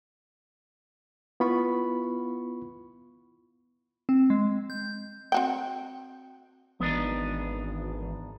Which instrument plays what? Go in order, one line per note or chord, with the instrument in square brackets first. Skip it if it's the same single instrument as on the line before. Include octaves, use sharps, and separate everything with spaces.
[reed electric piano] B3 E4 F4 B5 C#6
[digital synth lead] C4
G#3
G6
[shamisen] C4 F#4 G5
[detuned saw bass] G#1 [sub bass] E3 [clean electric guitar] B3 D4 D#4